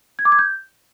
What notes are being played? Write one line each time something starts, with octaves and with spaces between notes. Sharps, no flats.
G#6
D6
G#6
G6